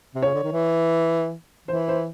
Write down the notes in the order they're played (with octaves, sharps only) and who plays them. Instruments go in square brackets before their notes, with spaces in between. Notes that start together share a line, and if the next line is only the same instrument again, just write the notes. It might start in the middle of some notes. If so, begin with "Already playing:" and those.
[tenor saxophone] C3
[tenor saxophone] C#3 [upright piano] C#5
[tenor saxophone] D3
D#3
E3
[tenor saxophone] E3 [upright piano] C5
[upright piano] C5